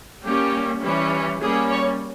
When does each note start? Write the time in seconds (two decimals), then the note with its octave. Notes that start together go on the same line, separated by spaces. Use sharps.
0.23 G3 A#3 C#4 G4
0.82 E3 G3 C#4
1.41 G3 A#3 C#4 G#4
1.71 C#5